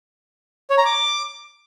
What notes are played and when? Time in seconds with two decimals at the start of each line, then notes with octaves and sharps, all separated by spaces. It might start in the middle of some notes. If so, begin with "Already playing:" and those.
0.70 C#5
0.78 A#5
0.85 D6